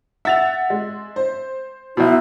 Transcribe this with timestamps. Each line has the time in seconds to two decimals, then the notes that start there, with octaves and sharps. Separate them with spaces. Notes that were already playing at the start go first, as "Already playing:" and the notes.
0.25 E5 F#5 A6 F7
0.70 G#3
1.16 C5
1.97 B1 B2 E4